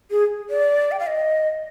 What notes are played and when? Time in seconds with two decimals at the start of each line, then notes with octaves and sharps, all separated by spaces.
0.11 G#4
0.50 D5
0.92 G5
0.99 F5
1.07 D#5